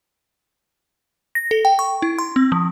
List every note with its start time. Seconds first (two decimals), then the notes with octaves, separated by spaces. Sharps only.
1.35 A#6
1.51 A4
1.65 G5
1.79 C#6
2.02 E4
2.19 C6
2.36 C4
2.52 F3